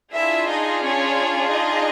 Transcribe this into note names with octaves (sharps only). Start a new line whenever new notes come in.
D4 E4 F4 G#4 E5
D#4 D#5
C#4 C#5
D#4 D#5